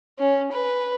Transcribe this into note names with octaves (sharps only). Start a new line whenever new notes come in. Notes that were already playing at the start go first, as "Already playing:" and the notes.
C#4
B4